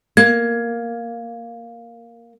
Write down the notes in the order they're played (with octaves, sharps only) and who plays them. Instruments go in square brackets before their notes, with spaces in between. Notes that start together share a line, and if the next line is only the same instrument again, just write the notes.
[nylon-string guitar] A#3 [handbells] G#6